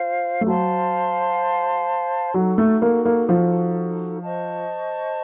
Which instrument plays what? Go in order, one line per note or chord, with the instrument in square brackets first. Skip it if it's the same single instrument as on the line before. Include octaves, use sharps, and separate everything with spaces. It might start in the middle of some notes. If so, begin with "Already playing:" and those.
Already playing: [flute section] F4 C5 F5
[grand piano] A3
[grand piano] F#3 [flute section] C5 F5 A5 C6
[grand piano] F#3 [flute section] D#4 F#4 A4
[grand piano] A3
A#3
A#3
F3
[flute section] C5 D#5 A5 C#6